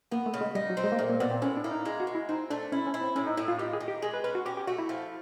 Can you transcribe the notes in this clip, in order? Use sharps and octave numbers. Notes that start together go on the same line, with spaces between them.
A#3 B3
A3
C#3
G#3
G3 D#4
F#3
C4
G#3
A#3
A#2 A3
A#3
A#2 B3
C4
A2 C#4
D4
A#3 E4
D#4
G#3 E4
F#4
G#3
E4
C4 D#4
A3 D4
C#4 E4
C#4
E4
C4
A2 C#4
D#4
A2 E4
F4
D#3 G4
G#4
D#3
G4
G#3 G#4
B4
C#4 B4
F#4
C#4 G4
G4
A3 F#4
E4
F3